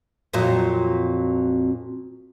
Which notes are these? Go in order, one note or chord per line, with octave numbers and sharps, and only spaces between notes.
F2 A#2 F#3